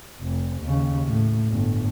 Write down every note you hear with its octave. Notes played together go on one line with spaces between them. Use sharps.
F1
D#2 C#3
A2
G1 A2